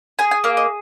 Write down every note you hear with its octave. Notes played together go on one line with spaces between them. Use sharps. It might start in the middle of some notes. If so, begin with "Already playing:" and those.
G#4 G#5
G#5
A#3 F5
D#5